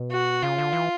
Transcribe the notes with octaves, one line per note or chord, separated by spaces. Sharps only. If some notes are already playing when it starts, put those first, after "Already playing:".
Already playing: B2
F#4
C#3 F4
D3
E3